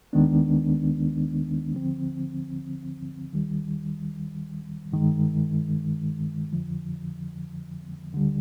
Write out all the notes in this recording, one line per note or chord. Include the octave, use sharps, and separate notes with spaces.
D#2 D#3 G#3 B3 D4
D2 D3 F3 C4
D#2 D#3 G3
G2 D#3 G#3
F2 D3 F3
D2 D3 G3